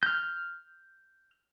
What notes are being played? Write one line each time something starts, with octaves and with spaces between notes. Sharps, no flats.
F6 G6